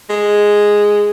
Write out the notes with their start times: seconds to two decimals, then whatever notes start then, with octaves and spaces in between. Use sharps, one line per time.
0.09 G#3